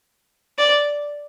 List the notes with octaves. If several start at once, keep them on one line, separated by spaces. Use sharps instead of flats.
D5